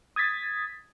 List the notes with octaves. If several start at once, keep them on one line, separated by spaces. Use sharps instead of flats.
D#6 G#6 A6 B6